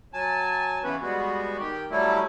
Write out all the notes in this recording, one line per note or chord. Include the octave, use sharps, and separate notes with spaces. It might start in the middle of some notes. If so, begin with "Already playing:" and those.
F#3 G#5 A5
C#3 E3 B3 C#4 B4
G3 G#3 B3 F#4
D#3 G4
F#3 G3 A3 E4